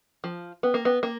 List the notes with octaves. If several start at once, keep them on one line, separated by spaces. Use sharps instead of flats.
F3
B3
A#3
B3
A#3